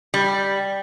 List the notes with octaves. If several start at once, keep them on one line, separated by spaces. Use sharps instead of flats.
G3